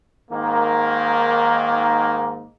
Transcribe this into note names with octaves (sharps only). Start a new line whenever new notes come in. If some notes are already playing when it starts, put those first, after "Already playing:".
G#2 D#3 A#3